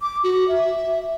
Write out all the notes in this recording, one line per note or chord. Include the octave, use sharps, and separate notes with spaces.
D6
F#4
E5